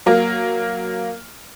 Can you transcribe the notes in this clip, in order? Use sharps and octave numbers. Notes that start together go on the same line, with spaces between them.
F#3 A#3